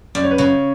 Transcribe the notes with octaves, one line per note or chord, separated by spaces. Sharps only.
F#2 D5
C#5
B4
C#3 C#5